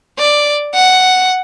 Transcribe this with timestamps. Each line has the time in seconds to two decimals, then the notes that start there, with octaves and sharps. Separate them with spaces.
0.18 D5
0.74 F#5